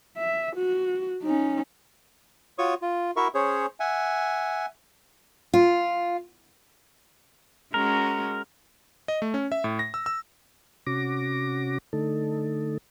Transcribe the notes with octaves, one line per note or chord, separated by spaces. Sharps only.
E5
F#4
C#4 D#4
F4 F#4 C#5 C#6 D#6
F4
E4 F#4 A#4 E5 C#6
C#4 G#4 C5 C#5
E5 F#5 G#5
F4
G#3 C#4 F#4 A#4
D#5
A3
C#4
E5
A2
A#6
E6
E6
C3 C#4 F#4 D6 A#6
D3 A3 D#4 A4